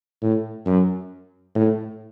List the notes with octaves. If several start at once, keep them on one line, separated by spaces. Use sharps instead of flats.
A2
F#2
A2